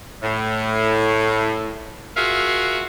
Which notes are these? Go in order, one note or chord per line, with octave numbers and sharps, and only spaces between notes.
A2
F4 F#4 G#4 A#4 E5 F5